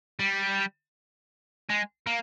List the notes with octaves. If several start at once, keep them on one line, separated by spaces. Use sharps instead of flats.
G3
G#3
A#3